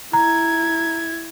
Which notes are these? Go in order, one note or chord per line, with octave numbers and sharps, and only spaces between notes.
E4 A#5 G#6